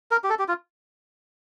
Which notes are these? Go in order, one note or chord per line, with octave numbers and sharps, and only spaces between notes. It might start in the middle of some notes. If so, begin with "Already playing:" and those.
A#4
G4
A4
G4
F4